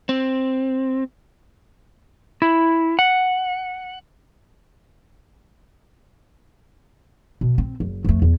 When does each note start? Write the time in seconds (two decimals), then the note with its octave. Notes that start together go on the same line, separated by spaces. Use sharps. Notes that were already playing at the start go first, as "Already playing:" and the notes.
0.09 C4
2.42 E4
2.99 F#5
7.41 B2
7.58 C4
7.80 F#1
8.05 F2 A3
8.22 E2